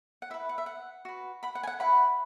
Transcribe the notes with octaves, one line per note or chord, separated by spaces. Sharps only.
F#5
E4 B4 E5
F#5
E5
F#5
F#4 B4
F#5 B5
F#5
G#5
F#5
E4 B4 F#5 B5